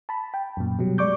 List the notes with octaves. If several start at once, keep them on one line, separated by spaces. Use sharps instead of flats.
A5 B5
G5
F#2 A#2
B2 F#3 G3
G#3 D5 C#6 D6 G6